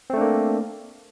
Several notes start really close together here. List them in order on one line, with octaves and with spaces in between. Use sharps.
C4 A3 D4 A#3